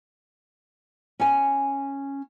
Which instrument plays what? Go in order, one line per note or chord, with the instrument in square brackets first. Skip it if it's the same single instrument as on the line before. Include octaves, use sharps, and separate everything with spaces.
[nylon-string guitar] C#4 G#5